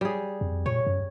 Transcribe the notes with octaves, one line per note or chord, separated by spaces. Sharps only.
G3 G#4
F2
A#2 C#5
F#2